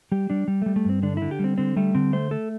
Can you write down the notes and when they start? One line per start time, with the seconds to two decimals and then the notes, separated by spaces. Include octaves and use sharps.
0.12 G3 G4
0.30 G3 D4
0.48 G3
0.62 G3 A3
0.76 A3
0.85 G2 C4
1.03 D3 D4
1.17 D3 E4
1.31 G4
1.39 G3 C4
1.58 D3 C4
1.76 G3 A3
1.95 D3 C4
2.13 A3 C5
2.31 A3 A4